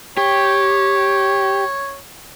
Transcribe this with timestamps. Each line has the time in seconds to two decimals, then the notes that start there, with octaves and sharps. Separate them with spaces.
0.17 G4 C#5